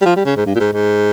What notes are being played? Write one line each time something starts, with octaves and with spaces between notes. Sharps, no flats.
G3
F3
G3
C#3
G#2
G2
A#2
G#2
G#2